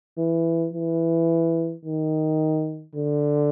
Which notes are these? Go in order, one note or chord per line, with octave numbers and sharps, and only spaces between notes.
E3
E3
D#3
D3